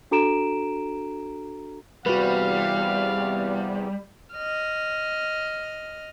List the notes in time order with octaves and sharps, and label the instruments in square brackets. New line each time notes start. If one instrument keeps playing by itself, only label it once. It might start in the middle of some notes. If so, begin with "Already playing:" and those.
[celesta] D4 F#4 A4 A#5 D7 E7
[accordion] E2 C3 [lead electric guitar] G3 [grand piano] F#4 B4 [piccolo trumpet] F5
[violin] D#5 F6